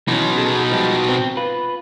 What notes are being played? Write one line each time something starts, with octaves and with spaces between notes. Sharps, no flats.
B2 E3 C#4 D#4
G#4 A4
F3 G3 G#3
C4
F4 B4